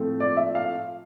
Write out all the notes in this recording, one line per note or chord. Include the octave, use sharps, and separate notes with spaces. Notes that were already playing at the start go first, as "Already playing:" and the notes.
Already playing: A2 F3 A3 C4
D5
E5
F5